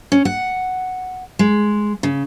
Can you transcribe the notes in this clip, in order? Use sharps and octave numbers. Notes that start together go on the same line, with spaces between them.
C#4
F#5
G#3
C#3